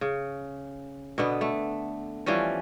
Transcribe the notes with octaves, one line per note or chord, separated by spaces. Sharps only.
C#3
B2 D3 B3
A3
E3 F3 G3 C#4